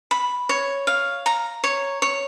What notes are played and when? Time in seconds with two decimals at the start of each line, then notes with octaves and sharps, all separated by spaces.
0.11 B5
0.49 C#5
0.87 F5
1.26 A#5
1.64 C#5
2.02 C#5